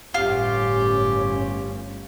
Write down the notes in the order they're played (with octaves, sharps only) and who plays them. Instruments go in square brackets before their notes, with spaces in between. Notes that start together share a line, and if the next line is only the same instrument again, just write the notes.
[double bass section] G1 A2 C#4 [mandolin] F4 [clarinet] G4